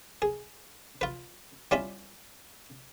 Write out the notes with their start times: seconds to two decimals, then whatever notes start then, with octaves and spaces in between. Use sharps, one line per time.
0.22 G#4
1.01 F4 B4
1.71 G3 C#4 E4 F4 B5